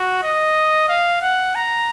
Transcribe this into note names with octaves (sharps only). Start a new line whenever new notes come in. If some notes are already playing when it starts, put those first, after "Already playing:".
Already playing: F#4
D#5
F5
F#5
A#5